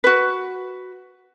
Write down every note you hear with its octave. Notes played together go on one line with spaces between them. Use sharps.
F#4 B4